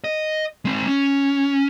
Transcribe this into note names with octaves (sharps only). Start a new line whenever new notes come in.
D#5
G#3 C4
C#4